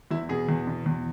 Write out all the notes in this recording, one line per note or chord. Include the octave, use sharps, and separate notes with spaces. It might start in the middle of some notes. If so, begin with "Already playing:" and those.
E2 E4
B2 G#4
E2
B2
E2